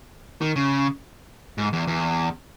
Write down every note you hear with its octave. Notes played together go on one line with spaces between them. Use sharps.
D#3
C#3
G#2
E2
E2